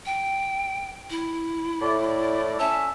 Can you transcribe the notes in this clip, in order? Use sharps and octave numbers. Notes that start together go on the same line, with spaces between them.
G5
E4
A2 D5
C#4 E5 A5